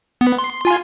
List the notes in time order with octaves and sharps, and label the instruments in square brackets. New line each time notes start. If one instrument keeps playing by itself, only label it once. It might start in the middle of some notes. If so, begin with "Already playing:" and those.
[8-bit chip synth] B3
C6
F4 G#5 C6